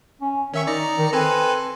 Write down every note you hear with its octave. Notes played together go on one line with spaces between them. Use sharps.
C#4
D#3 C#4 E5 C#6
D#4 D5 A#5 C#7
D#3
C4 A4 B4 G#5